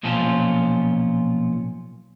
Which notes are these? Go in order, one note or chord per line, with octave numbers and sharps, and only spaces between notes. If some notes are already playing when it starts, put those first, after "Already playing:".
B1 A#2 F3 C#4 F4 A5